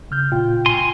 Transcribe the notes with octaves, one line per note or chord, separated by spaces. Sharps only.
C#3 F6 G6
A#2 F4 G5
G#5 C6